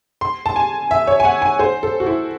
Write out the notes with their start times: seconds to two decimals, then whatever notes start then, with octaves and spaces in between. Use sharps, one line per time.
0.21 C6
0.46 A5
0.56 G#5
0.91 E5
1.07 C#5
1.20 G#5
1.25 F#5
1.42 G#5
1.59 C5
1.83 A4
2.00 F#4
2.06 E4